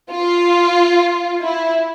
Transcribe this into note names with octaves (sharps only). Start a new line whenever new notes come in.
F4
E4